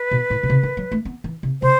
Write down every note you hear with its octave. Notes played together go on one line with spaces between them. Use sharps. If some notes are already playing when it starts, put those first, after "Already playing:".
Already playing: B4
B2
A2
B2
C3
D#3
F#3
A3
B3
E3
C3
C3 C5